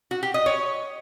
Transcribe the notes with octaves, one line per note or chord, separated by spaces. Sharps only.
F#4
G4
D#5
C#5